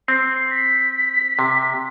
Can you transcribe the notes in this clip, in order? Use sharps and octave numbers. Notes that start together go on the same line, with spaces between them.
C4 C7
B6
C3